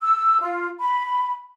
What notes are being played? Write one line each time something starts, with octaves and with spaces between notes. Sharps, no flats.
E6
F4
B5